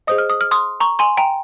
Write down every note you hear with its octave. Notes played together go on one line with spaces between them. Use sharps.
G#4 C5 D#5 D#6
F6
D#6
F6
C6 D#6
A#5 C#6
G#5 C6
G5 A#5